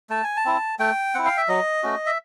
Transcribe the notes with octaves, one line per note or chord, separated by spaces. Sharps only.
A3 A5
G#5
A5
C4 E4
A3 G5
C4 E4 F#5
F5
E5
F#3 D#5
A3 C#4 F#4
E5